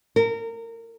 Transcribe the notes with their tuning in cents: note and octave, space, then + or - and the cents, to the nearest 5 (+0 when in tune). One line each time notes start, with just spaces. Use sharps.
A#4 -25